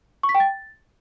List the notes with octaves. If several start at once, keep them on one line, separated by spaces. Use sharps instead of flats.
C#6
B6
G5
A6